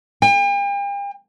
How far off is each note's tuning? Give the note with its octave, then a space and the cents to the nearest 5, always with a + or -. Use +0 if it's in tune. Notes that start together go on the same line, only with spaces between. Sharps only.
G5 +45